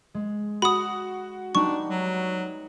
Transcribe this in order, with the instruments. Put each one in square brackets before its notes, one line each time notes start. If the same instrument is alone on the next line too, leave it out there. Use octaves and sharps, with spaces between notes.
[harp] G#3
[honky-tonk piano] F#4 [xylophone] B5 D#6
[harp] G3 B3 D#4 [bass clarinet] D4 [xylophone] C#6
[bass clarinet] F#3